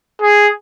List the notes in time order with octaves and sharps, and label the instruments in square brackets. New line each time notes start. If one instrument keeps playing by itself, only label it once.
[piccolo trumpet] G#4